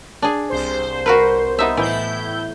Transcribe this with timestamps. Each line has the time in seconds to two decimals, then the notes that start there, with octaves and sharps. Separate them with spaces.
0.22 D4 G#4
0.50 C2 C5
1.06 F#4 A#4 B4
1.59 B3 D#4 E5
1.77 A2 E3 E4 G6